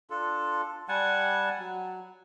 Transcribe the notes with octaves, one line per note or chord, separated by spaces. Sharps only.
D4 F4 A4
G3 F#5 G#5 A5
F#3